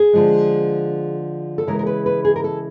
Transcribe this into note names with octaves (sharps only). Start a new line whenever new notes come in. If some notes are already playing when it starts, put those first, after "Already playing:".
Already playing: G#4
D3 F3 G#3
A4
C#3 E3 G#3 A#4
A#4
B4
B4
G#4
A#4
A4